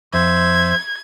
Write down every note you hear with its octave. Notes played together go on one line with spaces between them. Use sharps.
F2 C5 E5 G#6